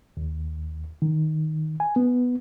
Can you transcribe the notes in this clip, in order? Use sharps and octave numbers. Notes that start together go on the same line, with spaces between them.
D#2
D#3
G#5
B3